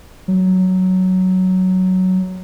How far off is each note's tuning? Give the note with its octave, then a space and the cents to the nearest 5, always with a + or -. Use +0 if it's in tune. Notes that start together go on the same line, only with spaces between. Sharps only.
F#3 +5